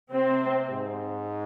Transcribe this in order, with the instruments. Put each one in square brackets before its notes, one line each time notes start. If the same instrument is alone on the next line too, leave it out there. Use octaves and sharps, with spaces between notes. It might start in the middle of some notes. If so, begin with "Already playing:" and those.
[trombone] C3 [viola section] C4
[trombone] G#2